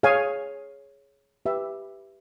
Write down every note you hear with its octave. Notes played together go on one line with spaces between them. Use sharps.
G#4 C#5 F5 G#5
G4 B4 E5